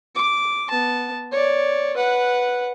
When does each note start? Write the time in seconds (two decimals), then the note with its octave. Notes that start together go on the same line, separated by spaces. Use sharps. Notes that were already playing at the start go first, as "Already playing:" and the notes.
0.15 D6
0.70 B3 A5
1.32 C#5 D5
1.96 B4 F#5